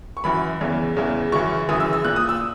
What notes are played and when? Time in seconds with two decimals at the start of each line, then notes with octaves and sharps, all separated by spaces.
0.17 C#6
0.24 F#2 E3 B5
0.61 E2 C#3 E3
0.96 E2 C#3 E3
1.32 F#2 C#3 E3 C#6
1.69 F#2 C#3 E3 D#6
1.80 E6
1.93 E6
2.05 A#2 F#6
2.16 D#6
2.29 E6